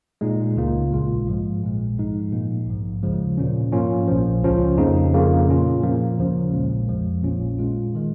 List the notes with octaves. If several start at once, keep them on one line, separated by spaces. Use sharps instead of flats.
A#2 G#3 D#4
C#2 C#3 A#3 F4
A#1 A#2 G#3 F4
G#2 F3 G#3
A#1 A#2 G#3
G#2 F3 G#3 D#4
A#2 F3 A#3 D#4
A#1 G#2 F3
D#2 C#3 F3 G#3
A#2 A#3 C#4
G#2 F3 A#3 C#4 F4
A#1 A#2 F3
C#2 C#3 F3 C#4 F4
F2 C#3 A#3 D#4
F2 C#3 A#3 F4
A#2 A#3 C#4 F4
A#2 F3 A#3
D#2 C#3 F3 C#4
A#1 A#2 G#3
F2 F3 G#3
A#1 A#2 A#3 C#4 F4
A#2 G#3 F4
D#3 G#3